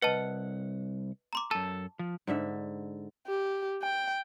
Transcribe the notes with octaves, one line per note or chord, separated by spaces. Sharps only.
C2 B4 D#5 F#5 A5
A#5 C6 D6
F#2 A4 A5
F3
G#2 D3 E5
G4
G5